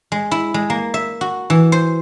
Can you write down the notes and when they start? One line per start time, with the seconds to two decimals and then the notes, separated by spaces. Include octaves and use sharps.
0.12 G#3
0.31 E4
0.54 G#3
0.70 A#3
0.94 E5
1.21 F#4
1.50 E3
1.72 C5